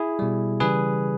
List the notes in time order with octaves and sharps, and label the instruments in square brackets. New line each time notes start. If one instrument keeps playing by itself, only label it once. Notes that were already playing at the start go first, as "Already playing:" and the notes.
Already playing: [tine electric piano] E4 G#4
B2 G3
C#3 E3 G3 G#4 B4